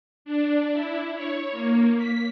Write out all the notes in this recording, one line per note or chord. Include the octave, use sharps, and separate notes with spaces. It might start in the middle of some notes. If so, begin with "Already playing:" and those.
D4
E4
C#5
A#3
B6